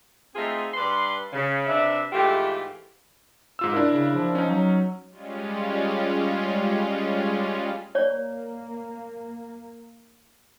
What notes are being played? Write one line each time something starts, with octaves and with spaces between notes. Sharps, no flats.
A3 C4 D#4 F4 G#4 C5
G2 B4 D5 C6
C#3
C3 D4 B4 E5
G#2 E3 A3 F4 G4
G#2 F4 E6
D4 E4 A#4
C#3
F3
C#4 D#4
F#3
G3 G#3 C#4 F4
A#3 C#5 D5